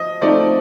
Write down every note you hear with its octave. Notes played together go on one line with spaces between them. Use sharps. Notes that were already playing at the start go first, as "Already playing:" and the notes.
Already playing: F3 D#5
F3 A3 C4 D#4 D5